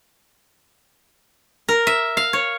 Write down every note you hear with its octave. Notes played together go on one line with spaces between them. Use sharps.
A#4
E5
F5
C#5